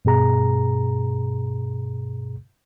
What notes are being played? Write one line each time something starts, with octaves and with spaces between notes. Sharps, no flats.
G2 B2 G#4 A#5